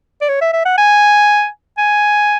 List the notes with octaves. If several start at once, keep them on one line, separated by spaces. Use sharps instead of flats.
D5
C#5
E5
E5
F#5
G#5
G#5